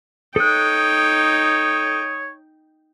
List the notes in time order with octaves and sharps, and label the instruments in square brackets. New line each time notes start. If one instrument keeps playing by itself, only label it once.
[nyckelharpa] D#4 G5 [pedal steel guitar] A4 F#6 [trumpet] C#5 [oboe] D#6